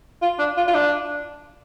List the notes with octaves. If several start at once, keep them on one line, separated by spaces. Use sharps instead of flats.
F4
D4
F4
F4
D4